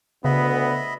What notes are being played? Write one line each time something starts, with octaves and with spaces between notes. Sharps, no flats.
D2 C#3 B3 D#5 E5 B5